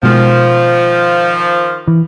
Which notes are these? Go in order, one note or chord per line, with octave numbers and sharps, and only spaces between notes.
B2 D#3 F3 G#3
E3